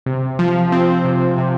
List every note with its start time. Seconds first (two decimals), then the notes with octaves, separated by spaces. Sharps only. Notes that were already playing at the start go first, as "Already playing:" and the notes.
0.06 C3
0.39 F3
0.72 C4
1.05 C3
1.38 C3